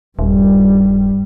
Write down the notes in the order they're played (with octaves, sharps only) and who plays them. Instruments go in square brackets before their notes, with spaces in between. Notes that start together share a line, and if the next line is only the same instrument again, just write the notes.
[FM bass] D#1 [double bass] G2 G3